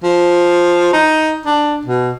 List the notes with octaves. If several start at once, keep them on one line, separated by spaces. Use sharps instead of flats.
F3
D#4
D4
B2